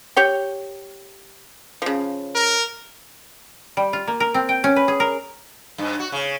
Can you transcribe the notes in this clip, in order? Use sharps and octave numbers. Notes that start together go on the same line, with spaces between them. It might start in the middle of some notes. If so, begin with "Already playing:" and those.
G4 C#5 G5
C#3 F3
A#4
G3
F4
A#3
A#4
C4
G5
C#4
B4
G#4
A#4
G2
F#4
C#3